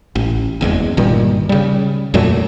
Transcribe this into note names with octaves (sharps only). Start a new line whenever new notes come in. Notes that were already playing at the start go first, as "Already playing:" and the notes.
A1
F#1 E2 C#3 G#3
G1 A#2 D#3 G3
C#3 G3
F2 A#2 F#3 A3